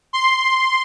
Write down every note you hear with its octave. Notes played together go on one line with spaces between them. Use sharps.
C6